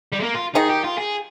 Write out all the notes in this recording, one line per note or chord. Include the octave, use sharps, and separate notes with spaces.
G3
G#3
A#3
F4
D#3 D#4 G#4
G4
F4
G#4